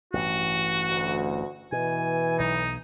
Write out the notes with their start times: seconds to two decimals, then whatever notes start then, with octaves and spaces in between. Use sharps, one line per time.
0.13 A1 G2 E3 F#4
0.89 D2
1.72 B2 E3 G#5
2.39 B1 D#4